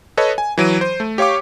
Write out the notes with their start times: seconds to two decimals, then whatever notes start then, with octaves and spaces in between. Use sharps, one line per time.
0.17 A4 B4 C#5 D#5
0.38 G#5
0.58 E3 F#3 D7 D#7
0.81 C5
1.00 A3
1.18 G4 C#5 F5 C#6 D6